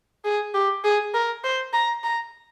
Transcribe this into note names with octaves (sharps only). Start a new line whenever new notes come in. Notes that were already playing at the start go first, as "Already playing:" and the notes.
G#4
G4
G#4
A#4
C5
A#5
A#5